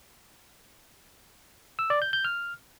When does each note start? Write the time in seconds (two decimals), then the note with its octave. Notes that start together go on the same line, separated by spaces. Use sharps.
1.79 E6
1.90 D5
2.02 G6
2.13 G6
2.25 F6